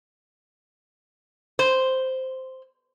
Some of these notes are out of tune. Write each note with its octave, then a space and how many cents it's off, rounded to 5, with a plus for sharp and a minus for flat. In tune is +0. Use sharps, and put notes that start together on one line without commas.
C5 -5